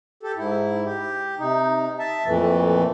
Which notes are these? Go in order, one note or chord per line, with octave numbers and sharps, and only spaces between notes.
G4 A4
G#2 E4
G4
C3 D#4
E5 A5
F2 A#2 E3 A3